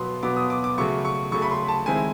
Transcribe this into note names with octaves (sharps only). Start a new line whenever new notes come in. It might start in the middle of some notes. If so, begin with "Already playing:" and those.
Already playing: B2 F#3 B3 C6
B2 F#3 B3 D6
D#6
D6
D6
C#3 F#3 A3 C#6
C#6
C#3 F#3 A3 C#6
B5
C6
A5
D#3 G#3 C4 E4 G#5